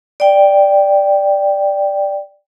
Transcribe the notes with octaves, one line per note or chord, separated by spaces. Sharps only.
D5 G5